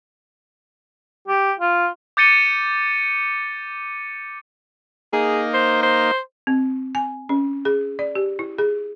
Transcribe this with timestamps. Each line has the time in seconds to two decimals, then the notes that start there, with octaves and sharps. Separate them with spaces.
1.28 G4
1.59 F4
2.17 D6 G6 A6 C#7 D#7 G7
5.13 A#3 D#4 G#4
5.54 C5
5.83 C5
6.47 C4
6.95 G#5
7.29 C#4
7.65 G#4
7.99 D5
8.15 G4
8.39 E4
8.58 G#4